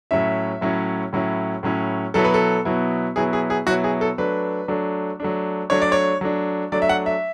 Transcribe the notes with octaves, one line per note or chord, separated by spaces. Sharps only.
A2 F#3 C#4 E4 E5
A2 F#3 C#4 E4
A2 F#3 C#4 E4
A2 F#3 C#4 E4
B2 F#3 B3 E4 A4
B4
A4
B2 F#3 B3 E4
B2 F#3 B3 E4 G#4
G#4
G#4
B2 F#3 B3 E4 F#4
G#4
A4
F#3 A3 D4 B4
F#3 A3 D4
F#3 A3 D4
F#3 A3 D4 C#5
D5
C#5
F#3 A3 D4
F#3 A3 D4 D5
E5
F#5
E5